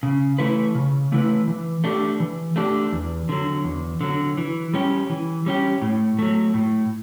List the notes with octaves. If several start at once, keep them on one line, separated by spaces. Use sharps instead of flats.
C#3
E3 A3 E4 B4
C#3
E3 A3 E4 B4
E3
A3 D4 G4
E3
A3 D4 G4
E2
D3 F#3
E2
D3 F#3
E3
G3 C#4 G4
E3
G3 C#4 G4
A2
F#3 A3
A2